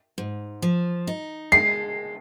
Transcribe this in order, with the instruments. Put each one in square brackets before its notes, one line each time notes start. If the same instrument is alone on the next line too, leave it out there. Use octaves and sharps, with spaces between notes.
[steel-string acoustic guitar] G#2
F3
D#4
[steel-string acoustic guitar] G#3 [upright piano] C7